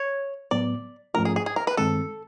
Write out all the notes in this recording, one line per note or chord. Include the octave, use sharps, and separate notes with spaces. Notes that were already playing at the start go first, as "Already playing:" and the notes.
Already playing: C#5
A2 F#3 B3 D5
G#2 F3 A3 C#4 F4 A#4
G#4
G#4
G#4
A#4
B4
G2 D#3 G#3 C4 A4